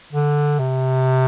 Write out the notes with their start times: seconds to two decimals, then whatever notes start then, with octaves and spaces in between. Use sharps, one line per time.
0.13 D3
0.59 C3